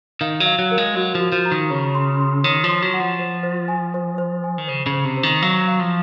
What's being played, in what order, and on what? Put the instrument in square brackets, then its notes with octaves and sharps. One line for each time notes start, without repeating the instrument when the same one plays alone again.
[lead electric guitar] D#3 [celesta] F5
[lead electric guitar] F#3
[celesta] F5
[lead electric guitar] F#3
[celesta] A#4
[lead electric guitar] G#3
[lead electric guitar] F#3 [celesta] F#4
[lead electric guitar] F3
[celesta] F#4
[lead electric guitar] F3
[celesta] A#5
[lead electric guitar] D#3
[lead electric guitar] C#3 [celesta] C#5
[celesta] C6
C6
[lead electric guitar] D#3 [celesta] C#5
[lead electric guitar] F3
[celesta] C6
[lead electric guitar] F#3
[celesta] F#5
[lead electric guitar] F3
[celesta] C5
C5
G#5
C5
C5
G#5
[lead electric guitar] D#3
[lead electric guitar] C#3 [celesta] C5
[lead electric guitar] C#3
[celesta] C5
[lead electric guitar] C3
[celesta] C5
[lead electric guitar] D#3
[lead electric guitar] F#3 [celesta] F5
[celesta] F5
[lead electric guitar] F3